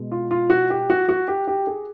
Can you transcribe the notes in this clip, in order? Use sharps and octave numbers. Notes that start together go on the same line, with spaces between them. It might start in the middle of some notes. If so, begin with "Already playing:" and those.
Already playing: B2 G#3
F4
F4
F#4
G4
F#4
F#4
G4
G4
G#4